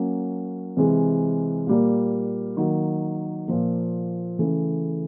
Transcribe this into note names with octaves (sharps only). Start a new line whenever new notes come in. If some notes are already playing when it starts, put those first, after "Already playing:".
Already playing: F#3 A#3 C#4
C3 E3 G#3
A#2 G3 A#3
D#3 F#3 A#3
A#2 F3 A#3
C#3 E3 A3